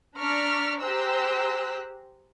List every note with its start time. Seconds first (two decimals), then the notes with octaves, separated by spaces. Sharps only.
0.18 D4 D5 A#5 C#6 F6 B6
0.81 G4 G#4 C5 A#5 E6 F#6